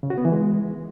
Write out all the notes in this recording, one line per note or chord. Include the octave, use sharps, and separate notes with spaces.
C#3
F#4
B3
E3
G#3